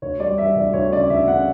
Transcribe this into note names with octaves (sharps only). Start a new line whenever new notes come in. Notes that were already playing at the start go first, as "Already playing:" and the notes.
D2 C#5
G3 D5
G3 E5
D2 D5
D2 C#5
C#3 D5
D2 E5
C#3 F#5